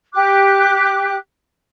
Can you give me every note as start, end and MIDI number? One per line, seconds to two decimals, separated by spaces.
0.13 1.16 67
0.13 1.16 86
0.13 1.16 90